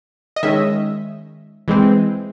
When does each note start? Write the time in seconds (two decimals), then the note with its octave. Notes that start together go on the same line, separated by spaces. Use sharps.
0.36 D#5
0.43 D#3 G#3 C#4 E5
1.68 E3 G#3 C4